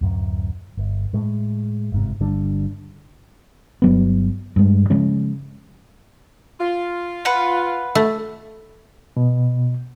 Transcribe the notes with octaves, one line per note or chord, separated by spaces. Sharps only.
D1 F#2
G1
A2 G#3
G1 G#2 C3
G1 D3 G3 D4
G1 F#3 B3
G2 G#3
C#3 F3 G#3 C#4
F4
B4 F#5
A3
B2